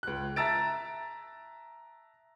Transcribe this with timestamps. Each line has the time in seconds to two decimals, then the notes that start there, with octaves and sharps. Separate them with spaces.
0.03 C#2 F#6
0.36 E5 A5 A#5 E6 A6 D7